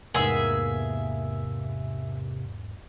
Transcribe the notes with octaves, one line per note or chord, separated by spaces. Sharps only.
E2 G#2 C3 A#3 B3 G#4 E5